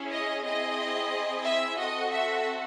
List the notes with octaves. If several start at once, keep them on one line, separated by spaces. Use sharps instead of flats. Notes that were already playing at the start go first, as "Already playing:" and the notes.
Already playing: C#4 E4 G#4
D#5
C4 E4 G#4 D#5
E5
C4 F#4 A4 D#5
E5